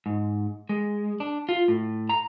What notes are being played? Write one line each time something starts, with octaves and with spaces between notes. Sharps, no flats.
G#2
G#3
D4
F4
A2
A#5